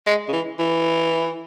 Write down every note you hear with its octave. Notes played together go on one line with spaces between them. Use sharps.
G#3
C#3
E3
E3